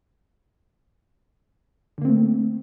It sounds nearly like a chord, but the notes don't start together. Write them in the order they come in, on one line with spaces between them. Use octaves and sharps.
D3 A#3 C4 A3